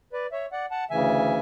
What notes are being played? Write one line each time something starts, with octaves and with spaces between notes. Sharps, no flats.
B4 D5
C#5 E5
D5 F#5
F#5 A5
D2 C#3 E3 E5 G#5